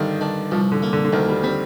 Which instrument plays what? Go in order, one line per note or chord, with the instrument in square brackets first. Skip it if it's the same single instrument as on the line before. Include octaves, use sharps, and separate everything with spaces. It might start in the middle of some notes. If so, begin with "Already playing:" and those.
Already playing: [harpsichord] G2 [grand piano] D3 D#3
[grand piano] D#3 [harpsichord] D4
[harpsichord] C2 [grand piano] F3
[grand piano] D3
[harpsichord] A#3
[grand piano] D3
D3
[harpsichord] D2 [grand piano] D#3
[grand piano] G3
[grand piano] G3 [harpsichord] C4